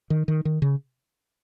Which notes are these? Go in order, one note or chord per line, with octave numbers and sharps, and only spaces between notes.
D#3
D#3
D#3
C#3